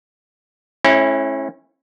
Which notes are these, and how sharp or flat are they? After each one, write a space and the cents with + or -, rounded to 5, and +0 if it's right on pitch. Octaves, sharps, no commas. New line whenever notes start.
A3 -45 C#4 -30 E4 +0